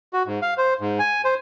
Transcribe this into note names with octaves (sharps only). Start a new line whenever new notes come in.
F#4
G#2
F5
C5
G#2
G#5
C5